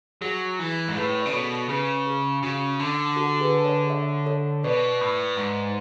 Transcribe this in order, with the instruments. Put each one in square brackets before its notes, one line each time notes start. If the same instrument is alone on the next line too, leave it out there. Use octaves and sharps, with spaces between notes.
[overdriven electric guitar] F#3 [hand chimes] G#4
[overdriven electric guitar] E3
G#2
[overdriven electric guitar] A2 [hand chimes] G#4 B4
[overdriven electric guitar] C#3 [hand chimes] D5
[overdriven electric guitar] B2 [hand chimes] A4 C#5
[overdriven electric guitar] C#3 [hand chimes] G#4 B4
[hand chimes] G#4
[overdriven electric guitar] C#3 [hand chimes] F#4
[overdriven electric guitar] D3
[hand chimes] F#4 A4
G#4 B4
A4 C#5
C#5 E5
A4 C#5
[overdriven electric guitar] B2 [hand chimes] B4 D5
[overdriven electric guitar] A2
G#2